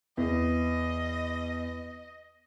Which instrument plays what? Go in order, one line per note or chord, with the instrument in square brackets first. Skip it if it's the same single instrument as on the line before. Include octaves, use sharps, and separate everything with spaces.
[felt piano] E2 [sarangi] D#5